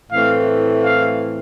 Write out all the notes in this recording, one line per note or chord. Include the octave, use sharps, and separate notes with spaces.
A2 E3 A3 C4 F5
F5